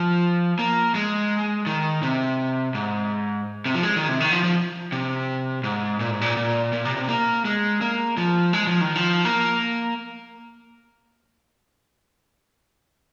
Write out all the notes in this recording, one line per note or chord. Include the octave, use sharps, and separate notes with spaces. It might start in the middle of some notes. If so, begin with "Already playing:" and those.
Already playing: F3
A#3
G#3
D#3
C3
G#2
C3
F3
G#3
D#3
C3
D#3
F3
F3
C3
G#2
A#2
G#2
A#2
A#2
A#2
C3
C3
A#3
G#3
A#3
F3
G#3
F3
D#3
F3
A#3